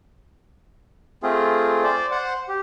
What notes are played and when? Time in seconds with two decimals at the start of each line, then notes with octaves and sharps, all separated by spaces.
1.23 A3 C4 F4 G#4
1.84 C5 D5
2.11 C5 F#5
2.48 G4